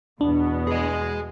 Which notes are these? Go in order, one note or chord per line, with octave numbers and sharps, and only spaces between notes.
E2 B2 B3 D4
G#4 D#5